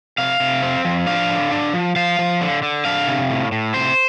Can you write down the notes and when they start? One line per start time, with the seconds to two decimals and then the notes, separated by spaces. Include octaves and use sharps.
0.18 C3 F5
0.40 C3
0.62 C4
0.85 F3
1.07 D4 F5
1.29 D3
1.51 D4
1.74 F3
1.96 F3 F5
2.19 F3
2.41 D3
2.63 D3
2.85 D4 F5
3.07 C3
3.30 A2
3.52 A2
3.74 C3 C5